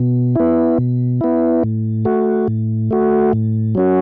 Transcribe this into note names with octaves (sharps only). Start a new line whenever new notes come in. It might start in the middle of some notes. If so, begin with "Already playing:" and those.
Already playing: B2
B3 E4
B2
B3 E4
A2
A3 F#4
A2
A3 F#4
A2
F#3 C#4 F#4